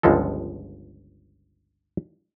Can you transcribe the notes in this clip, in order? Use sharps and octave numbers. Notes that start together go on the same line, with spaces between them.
G1 C#2 F3 G#3 A4